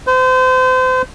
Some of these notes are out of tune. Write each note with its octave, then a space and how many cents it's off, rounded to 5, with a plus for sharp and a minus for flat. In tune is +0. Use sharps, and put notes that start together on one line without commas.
C5 -35